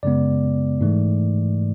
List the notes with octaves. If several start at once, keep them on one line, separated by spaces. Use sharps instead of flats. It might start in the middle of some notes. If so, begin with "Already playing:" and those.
F#2 C#3 G#3 B3 D5
G#2 E3 A3